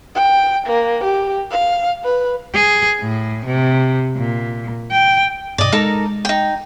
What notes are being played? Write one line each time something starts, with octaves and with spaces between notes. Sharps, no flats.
G5
A#3
G4
F5
B4
G#4
A2
C3
A#2
G5
G2 B2 D5 D#5
G#3 D#4 A4 A#4
D#4 G5